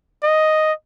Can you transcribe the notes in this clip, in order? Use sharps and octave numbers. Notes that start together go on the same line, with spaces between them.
D#5